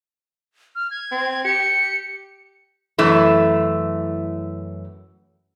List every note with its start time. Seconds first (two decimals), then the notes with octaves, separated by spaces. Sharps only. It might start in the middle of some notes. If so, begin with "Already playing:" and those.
0.75 F6
0.91 G#6
1.12 C4
1.45 G4 C#7
2.98 F#2 E3 A3